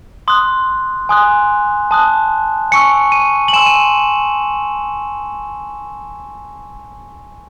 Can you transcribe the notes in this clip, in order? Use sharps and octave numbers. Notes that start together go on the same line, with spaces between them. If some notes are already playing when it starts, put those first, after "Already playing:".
C6 D#6 F#6
G#5 C6 D#6 F#6
A5 D#6 F#6
G#5 C#6 E6 C#7
D#7
F#7
G#5 C6 E6 E7
D#7